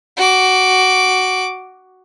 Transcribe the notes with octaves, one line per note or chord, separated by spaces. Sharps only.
F#4 D6